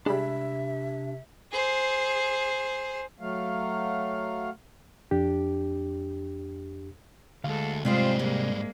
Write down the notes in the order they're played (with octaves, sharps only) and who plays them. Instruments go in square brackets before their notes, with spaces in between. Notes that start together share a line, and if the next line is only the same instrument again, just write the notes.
[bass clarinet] C3 [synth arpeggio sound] G3 G#3 [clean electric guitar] D4 B5 [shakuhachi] E5
[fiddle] G#4 C5
[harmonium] F#3 A3 F5
[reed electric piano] F2 D4 G4
[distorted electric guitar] D2 [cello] G#3 A4 [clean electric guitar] F5
[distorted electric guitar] G#2 G4 [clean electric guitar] C3 [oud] G3 G#3 C4 [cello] F4 C5
[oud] G3 [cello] G#3 A#3